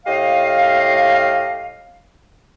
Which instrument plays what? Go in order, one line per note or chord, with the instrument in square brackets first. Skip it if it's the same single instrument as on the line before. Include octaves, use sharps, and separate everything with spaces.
[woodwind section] A2 G4 D#5 F5